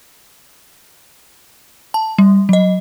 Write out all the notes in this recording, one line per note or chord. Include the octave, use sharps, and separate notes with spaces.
A5
G3
F#3 D#5